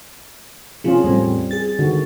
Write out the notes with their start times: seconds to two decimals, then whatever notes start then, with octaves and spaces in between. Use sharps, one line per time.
0.84 C3 F3 C#4 F4 G#4
1.04 E2 A2 G3 C4
1.51 G#4 A6
1.79 D3 D#3 F#4